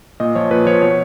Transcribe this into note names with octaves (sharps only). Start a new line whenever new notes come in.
A#2 D#5
F3 C#5
A#2 B4
F3 C#5
B2 C#5